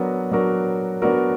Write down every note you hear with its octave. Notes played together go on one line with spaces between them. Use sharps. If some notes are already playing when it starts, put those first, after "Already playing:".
Already playing: F#3 B3 D4 F#4 A#4
F#3 B3 D4 F#4 A#4
F#3 B3 D4 F#4 A#4